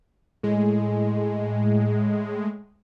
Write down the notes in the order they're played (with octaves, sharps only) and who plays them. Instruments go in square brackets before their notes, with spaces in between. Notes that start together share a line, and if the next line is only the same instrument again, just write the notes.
[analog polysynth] A2 G#3